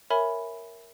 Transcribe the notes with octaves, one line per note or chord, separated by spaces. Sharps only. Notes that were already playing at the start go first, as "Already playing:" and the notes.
A#4 C#5 E5 G#5 B5